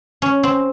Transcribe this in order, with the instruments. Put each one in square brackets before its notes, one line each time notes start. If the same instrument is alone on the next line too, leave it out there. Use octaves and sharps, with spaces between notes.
[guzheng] C#4
C4